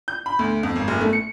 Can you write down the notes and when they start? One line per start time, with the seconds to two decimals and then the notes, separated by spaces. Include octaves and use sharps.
0.08 G6
0.26 B5
0.39 D2
0.63 F2
0.76 G#1
0.88 F#1
1.01 A3
1.13 C#7